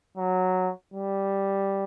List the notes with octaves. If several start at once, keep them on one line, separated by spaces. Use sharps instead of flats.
F#3
G3